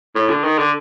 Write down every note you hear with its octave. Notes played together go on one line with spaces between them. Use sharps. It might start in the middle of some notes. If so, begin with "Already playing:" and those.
A2
D3
D#3
D3